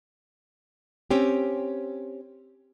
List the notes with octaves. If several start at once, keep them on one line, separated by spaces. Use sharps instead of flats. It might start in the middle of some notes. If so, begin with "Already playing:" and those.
C4 C#4 G4